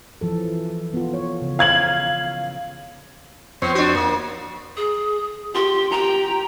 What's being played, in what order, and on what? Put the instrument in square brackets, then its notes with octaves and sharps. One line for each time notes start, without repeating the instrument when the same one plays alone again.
[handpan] E3 F3 A4
B3 F4
C#5
C#3
[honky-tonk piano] F5 G#6 F#7
[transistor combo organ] F2 C5 C#5 [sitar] B3
[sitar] D4 F#4
A#3
[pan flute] G#4
[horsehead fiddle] G4 [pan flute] C6
[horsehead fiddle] G4 G5 [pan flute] A#5